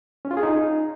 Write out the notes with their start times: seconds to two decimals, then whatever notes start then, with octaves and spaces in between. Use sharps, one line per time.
0.25 C#4
0.31 F4
0.37 G#4
0.43 D#4